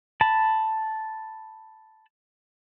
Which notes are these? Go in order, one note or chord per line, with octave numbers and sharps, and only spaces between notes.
A5 B5